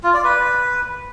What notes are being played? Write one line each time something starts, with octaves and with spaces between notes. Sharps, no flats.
F4
D5
B4